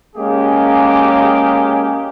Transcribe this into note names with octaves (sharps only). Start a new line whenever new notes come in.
G#3 A#3 C#4 G4 G#4